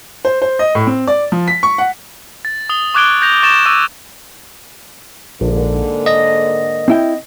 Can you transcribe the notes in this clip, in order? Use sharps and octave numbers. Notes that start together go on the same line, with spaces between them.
C5
C5
D#5
A2
C4
D5
F3
B6
C#6
F#5
A6
D#6 F7 G7
C#6 D6 F#6 G#6 D7 G7
G6 A#6 F7
C#6 A6 E7
D6 E6 D#7 E7
A#1 G#2 D3 A#3
D#5 A#6
C4 E4 G5